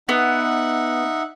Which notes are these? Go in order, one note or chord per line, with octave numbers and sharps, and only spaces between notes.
B3 D#4 E5 F#5